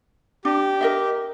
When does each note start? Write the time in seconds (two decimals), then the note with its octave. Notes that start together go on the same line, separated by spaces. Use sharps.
0.45 D4 G4
0.81 A#4 D#5 E5